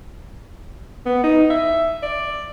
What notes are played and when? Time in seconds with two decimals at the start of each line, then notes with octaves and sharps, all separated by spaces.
1.06 B3
1.24 D#4
1.50 E5
2.03 D5